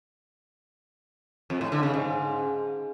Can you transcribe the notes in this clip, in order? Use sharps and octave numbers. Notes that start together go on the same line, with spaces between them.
F2
A2
D3
C#3
G#2